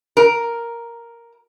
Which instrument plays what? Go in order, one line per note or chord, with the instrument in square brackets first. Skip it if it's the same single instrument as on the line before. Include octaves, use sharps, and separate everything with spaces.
[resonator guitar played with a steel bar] A#4